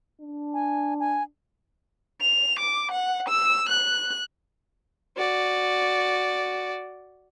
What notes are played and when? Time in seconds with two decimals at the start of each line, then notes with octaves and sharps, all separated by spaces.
0.21 D4
0.54 G#5
1.00 G#5
2.22 F7
2.59 D6
2.91 F#5
3.28 E6
3.69 F#6
5.17 F#4 D5